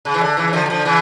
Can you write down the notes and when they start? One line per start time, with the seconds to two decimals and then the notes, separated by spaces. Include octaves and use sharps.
0.05 C#3
0.14 E3
0.21 D3
0.37 C#3 E3
0.48 E3
0.53 D3 F3
0.66 G3
0.70 D3 F3
0.85 C#3 E3